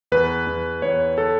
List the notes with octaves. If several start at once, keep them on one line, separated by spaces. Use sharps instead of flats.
E2 B4
E2
E2 C#5
A4